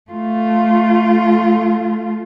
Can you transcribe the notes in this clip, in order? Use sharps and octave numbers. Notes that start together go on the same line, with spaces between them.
A3 F4